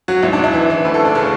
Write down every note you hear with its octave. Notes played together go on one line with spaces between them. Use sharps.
F#3 F#4
G#1 E4
D4
G#1
E4
E3
E3
D2 B4
A4
D2
D4
C#3 C#4